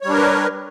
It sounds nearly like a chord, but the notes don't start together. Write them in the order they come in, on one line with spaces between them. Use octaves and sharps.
C#5 G3 D4 A#4 B4